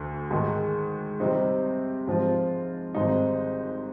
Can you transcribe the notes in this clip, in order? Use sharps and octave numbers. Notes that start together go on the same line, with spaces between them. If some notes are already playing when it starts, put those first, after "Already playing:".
Already playing: D2 D3
G#2 D#3 G#3
C3 G3 C4 D#4
G#2 F3 C4 F4
G#1 G#2 G3 C4 D#4